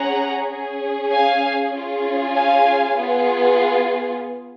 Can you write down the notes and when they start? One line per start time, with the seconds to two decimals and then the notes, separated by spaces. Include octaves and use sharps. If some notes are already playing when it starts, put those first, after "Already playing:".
Already playing: C#4 G#4 F#5 A#5
0.52 C#4 G#4
1.13 F5 G#5
1.74 C#4 F4 G#4
2.34 F5 G#5
2.96 B3 F4 G#4